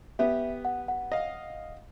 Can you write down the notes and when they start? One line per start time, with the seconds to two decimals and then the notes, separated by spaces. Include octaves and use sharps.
0.19 B3 G4 E5
0.65 F#5
0.88 F#5
1.12 D#5 F5